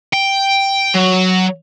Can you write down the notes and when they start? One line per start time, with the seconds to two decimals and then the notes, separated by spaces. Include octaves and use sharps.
0.14 G5
0.95 F#3